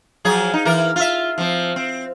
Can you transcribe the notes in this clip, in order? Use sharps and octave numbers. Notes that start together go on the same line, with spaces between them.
F3 F#3 G#4
D#4
E3 A#4
F4 E5
F3 C4
C4